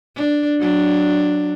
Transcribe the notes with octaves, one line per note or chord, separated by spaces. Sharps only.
D4
F#3 D4